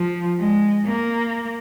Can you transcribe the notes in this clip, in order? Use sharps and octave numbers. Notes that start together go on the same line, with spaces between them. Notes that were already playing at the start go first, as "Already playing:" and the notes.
Already playing: F3
G#3
A#3